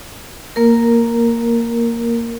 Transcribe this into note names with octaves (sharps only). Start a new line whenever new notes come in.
A#3 A#4